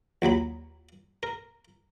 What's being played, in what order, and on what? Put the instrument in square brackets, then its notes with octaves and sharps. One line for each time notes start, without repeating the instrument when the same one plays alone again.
[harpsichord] A#1 D#2 F#3 B5
A#4